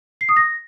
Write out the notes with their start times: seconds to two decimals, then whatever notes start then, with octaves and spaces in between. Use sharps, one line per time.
0.21 C7
0.29 D#6
0.36 A#6